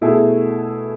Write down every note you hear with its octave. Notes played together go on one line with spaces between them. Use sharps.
B2 A3 E4 G#4